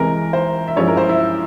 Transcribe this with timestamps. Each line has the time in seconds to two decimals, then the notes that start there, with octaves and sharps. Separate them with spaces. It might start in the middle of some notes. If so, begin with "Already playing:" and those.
Already playing: C2 C3 E3 G#3 A#4
0.33 C5
0.68 E5
0.76 G2 F3 G#3 C#4 E4 C#5
0.88 A#4
0.97 C5
1.09 E4 E5